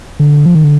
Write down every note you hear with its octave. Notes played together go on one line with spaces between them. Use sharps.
D3
F3
D#3
D3